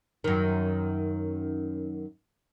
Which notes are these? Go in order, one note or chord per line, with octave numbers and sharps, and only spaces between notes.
F#2 D#3